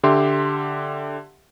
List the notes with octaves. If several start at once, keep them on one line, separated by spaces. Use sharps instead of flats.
D3 G4 E5 C6